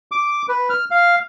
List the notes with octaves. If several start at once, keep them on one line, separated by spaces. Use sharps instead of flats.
D6
B4
F6
F5